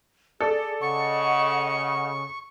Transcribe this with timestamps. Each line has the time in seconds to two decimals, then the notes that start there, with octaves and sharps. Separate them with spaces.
0.41 G#4 A4 D5
0.81 C#3 D#5 F#5 C#6